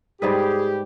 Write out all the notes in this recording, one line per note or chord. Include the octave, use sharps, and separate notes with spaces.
G#2 G3 G4 G#4 B4